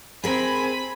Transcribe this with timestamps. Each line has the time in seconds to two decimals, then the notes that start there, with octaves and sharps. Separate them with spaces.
0.24 C4 G#4 A#4 G#5 B5